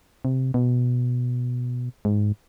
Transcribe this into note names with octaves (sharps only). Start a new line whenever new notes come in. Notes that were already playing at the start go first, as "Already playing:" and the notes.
C3
B2
G#2